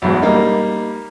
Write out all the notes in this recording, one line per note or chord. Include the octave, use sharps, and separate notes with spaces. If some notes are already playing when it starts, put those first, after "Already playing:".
B1 E2 G#2 B2
G3 A#3 D#4